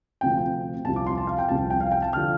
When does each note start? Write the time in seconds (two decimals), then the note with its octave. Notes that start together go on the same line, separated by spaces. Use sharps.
0.21 D2 C3 F3 G5
0.85 C2 C3 F3 A5
0.96 D6
1.07 C6
1.18 A5
1.27 F5
1.38 G5
1.49 C2 C3 F3 A5
1.70 G5
1.81 F5
1.92 G5
2.02 A5
2.13 D3 F3 F6